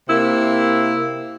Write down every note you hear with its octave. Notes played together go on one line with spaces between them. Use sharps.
C3 A#3 E4